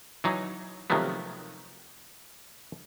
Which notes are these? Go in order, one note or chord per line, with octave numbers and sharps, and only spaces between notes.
E3 F#3 D#4
C3 D#3 F3 F#3 A3 B3